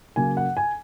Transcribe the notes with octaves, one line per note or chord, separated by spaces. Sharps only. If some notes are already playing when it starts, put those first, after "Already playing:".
C#3 F#3 A#3 G#5
F#5
G#5